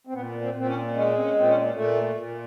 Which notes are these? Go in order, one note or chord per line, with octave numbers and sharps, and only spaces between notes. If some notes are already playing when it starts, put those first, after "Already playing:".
C4
A#2 B3
C4
A#2 C4
C#4
G#3 C#4
C4
C#4
A#2 C4
C#4
A#2 A3
A#2